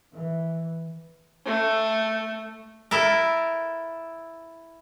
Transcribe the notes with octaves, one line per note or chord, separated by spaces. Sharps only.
E3
A3
E4 A4 A#4